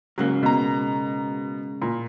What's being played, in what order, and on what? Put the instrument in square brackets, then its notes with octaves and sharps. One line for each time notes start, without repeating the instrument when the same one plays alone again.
[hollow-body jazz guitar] G#2 C#3 A#3 [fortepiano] F#3
[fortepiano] B2 A#5
A#2